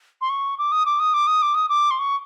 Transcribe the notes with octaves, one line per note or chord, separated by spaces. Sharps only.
C6
C#6
D6
D#6
D6
D#6
D6
D#6
D6
D#6
D6
C6
C#6